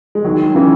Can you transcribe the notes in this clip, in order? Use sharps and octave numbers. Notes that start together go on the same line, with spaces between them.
G#3
D#3 F#3
C#3 E3